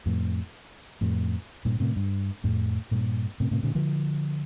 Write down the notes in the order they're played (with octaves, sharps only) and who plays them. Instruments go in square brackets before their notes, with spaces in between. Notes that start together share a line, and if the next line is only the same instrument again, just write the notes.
[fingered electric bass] F2 A2
F2 A2
G2 A#2
A2 C3
G2
F2 A2
G2 A#2
A2 C3
A2 C3
A#2 D3
D3 F3